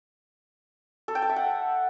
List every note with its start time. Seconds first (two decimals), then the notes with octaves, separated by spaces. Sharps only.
1.08 A4
1.15 G5
1.22 A5
1.29 E5
1.36 F#5